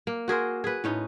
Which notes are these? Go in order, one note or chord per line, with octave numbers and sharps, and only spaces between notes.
A#3
F#4 G#4 A#4 C5
G#4 B4
A2 C#4 D#4